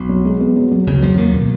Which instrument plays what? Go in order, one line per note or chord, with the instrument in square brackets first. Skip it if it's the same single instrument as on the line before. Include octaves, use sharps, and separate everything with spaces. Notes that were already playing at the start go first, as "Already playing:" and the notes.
Already playing: [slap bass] B1 B2
[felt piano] F#3
G#3
B3
F#3
F#3
[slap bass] C#2 C#3 [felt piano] F#3
[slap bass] F2 F3 [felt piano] F#3
[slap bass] D#2 D#3 [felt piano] A#3
[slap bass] B2